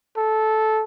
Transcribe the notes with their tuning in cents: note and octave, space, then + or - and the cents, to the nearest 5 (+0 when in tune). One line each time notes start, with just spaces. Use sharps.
A4 -15